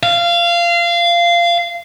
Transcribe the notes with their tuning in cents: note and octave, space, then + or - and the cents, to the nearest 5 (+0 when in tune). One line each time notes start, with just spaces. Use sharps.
F5 -20